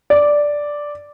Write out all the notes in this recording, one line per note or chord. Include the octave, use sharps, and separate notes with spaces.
D5